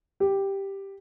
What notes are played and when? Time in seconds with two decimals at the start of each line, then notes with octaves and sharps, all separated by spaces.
0.20 G4